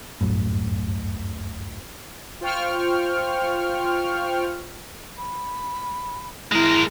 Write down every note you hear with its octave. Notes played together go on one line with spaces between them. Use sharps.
D1 G1 F#2 A2
F4 C5 G5 C#6 F6
B5
G#3 E4 A#4